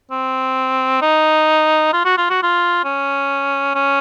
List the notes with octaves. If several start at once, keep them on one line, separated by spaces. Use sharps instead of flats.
C4
D#4
F4
F#4
F4
F#4
F4
C#4
C#4